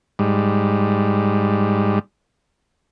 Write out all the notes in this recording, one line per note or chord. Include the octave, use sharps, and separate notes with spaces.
G#2 G3